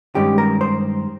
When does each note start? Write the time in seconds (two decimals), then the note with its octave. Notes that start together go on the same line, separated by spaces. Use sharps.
0.15 G2 D#3 G#3 C#4 G4
0.38 A#4
0.61 C5